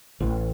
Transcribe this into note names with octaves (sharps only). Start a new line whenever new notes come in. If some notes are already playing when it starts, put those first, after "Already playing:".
A1